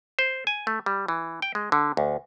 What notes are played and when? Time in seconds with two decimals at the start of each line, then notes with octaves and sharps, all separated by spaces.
0.19 C5
0.47 G#5
0.67 A3
0.86 G3
1.08 E3
1.42 G5
1.55 G#3
1.72 D3
1.97 D2